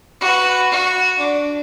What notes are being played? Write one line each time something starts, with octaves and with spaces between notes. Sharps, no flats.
F#4 B4
F#4
D4